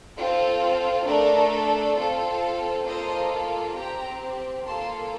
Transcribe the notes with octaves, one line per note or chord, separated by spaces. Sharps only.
C4 F4 A4
A3 D4 A4 A#4 D5
C4 F4 A4
A#3 F4 A4 C5 D#5
C4 G4 G5 A#5
A#3 F4 A4 A5 C6